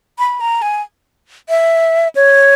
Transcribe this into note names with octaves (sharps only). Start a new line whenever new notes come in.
B5
A#5
G#5
E5
C#5